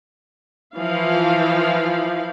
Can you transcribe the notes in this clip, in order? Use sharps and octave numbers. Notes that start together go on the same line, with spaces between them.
E3 F3 F5